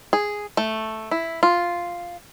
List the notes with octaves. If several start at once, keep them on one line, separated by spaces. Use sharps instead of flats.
G#4
A3
E4
F4